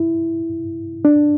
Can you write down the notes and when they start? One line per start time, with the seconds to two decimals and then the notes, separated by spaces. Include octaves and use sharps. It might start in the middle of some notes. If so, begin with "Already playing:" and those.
Already playing: E4
1.05 D4